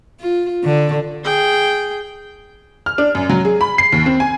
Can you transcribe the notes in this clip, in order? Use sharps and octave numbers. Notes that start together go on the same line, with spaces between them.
F4
D3
G#4 G5
F6
D4
F#2
F#3
G#4
B5
C7
D#2
C4
G#5